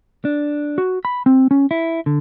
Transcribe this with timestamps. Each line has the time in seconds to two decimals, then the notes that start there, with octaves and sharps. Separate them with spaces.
0.25 D4
0.78 F#4
1.05 B5
1.26 C4
1.51 C#4
1.71 E4
2.06 D3